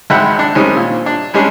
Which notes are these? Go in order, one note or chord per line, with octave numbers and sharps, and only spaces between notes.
G#1 G#3 E5 F#5 G5 B5
D4
D#3 G3 G#3 C4 C#4
A#2
D4
G3 G#3 C#4 D4